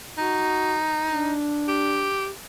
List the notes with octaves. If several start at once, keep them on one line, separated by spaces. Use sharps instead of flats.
D#4 F#4
D4
G4